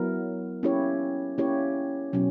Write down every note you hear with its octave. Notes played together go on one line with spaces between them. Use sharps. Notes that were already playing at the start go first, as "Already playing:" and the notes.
Already playing: F#3 B3 E4 A#4
A#3 C#4 E4 G4 C#5
A#3 C#4 E4 G4 C#5
B2 F#3 C#4